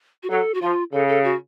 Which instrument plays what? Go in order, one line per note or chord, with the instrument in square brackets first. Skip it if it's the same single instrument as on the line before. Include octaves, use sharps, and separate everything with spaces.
[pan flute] F#4
[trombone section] F#3 [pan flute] A4
[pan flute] F#4
[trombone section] F3 [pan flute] F4
[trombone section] C#3 [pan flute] A4
[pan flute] A4
F#4